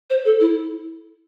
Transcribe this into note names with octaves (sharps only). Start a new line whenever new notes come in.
C5
A4
E4